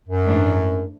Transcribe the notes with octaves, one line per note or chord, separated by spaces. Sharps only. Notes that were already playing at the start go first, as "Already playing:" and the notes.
F#2
G#2 E3 A3 D4